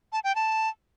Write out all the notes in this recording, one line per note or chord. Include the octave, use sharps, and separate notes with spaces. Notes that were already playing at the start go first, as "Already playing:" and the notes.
A5
G5
A5